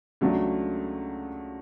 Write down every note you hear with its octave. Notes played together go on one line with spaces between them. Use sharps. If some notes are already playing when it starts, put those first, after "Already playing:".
C#2 C#3 F#3 A3 D4